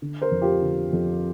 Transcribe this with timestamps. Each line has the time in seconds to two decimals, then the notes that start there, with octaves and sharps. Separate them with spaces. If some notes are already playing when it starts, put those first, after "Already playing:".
0.02 D3
0.22 A#4 C5
0.31 F2
0.42 F4 G4
0.62 D3
0.93 F2